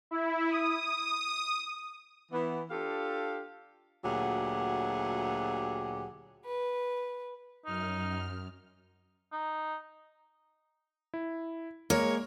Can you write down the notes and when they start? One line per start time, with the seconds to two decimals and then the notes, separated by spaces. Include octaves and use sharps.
0.11 E4
0.51 D#6
2.32 E3 B3
2.71 D4 F4 G4 A4 F5
4.04 D2 A#2 F#3 G4 G#4 F#5
6.45 B4
7.66 F#2 D#4 F6
9.32 D#4
11.14 E4
11.90 G#3 A#3 A#4 C#5